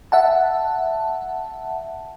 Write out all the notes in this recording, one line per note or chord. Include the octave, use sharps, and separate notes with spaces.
E5 F#5 A5